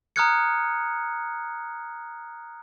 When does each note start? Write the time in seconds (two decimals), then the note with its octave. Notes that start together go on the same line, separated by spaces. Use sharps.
0.16 A#5 D#6 F6 F#6 G#6 C#7